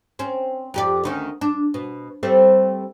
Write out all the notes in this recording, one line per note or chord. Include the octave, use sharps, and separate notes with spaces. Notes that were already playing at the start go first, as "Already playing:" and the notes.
C4 C#4
F2 G4 D5
D2 D#3 C#4
D4
B2
G3 A3 C4